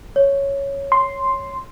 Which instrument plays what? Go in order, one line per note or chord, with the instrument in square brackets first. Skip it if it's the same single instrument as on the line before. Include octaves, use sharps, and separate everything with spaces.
[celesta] C#5
[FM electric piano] C6